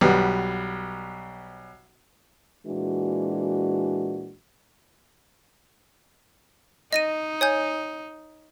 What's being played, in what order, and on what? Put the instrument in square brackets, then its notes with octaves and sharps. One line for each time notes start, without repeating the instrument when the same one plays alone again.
[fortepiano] B1 G3 B3
[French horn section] A#2 E3 G#3 D4 F#4
[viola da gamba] D#4 [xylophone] D#5 A#6 D#7
[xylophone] C#5 G#5 G6